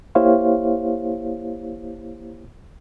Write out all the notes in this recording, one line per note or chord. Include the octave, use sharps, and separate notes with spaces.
A#3 E4 G4 C5 C#5 F5